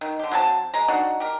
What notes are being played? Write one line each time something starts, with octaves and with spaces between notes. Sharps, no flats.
D#3
D3 G4
F#3 C4 F#4 A5
G#3 A#5
D4 D#4 F#4
G4 A#4